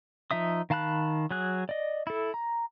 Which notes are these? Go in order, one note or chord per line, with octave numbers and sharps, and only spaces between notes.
F3 D#4 E5 D#6
D#3 F5 A5 B5 F#6
F#3 G#4 F#6
D5 D#5
E4 A4
A#5